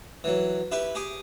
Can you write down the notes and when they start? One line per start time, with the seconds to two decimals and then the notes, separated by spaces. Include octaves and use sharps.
0.24 E3 F#3
0.72 E4 G4 B4 E5
0.95 G4 G#4 G#5 D6